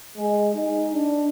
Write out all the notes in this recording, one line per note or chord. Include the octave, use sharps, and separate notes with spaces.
G#3
D#4
D4